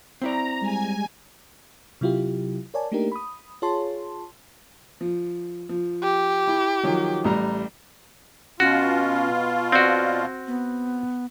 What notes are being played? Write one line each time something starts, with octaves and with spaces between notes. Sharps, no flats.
C4 E4 D5 A#5
G3 G#3 G#5
C3 F#3 E4 F4 G4
A#4 C#5 D5 G#5 A5
A3 A#3 D4 D#4 G4 A#4
B5 D#6
F4 G#4 C#5 A5 C6
F3
F3
G4
E4
D#3 F3 F#3
A1 G3 A#5
B2 C#4 F4 F#4
C4 F#4 D5
B3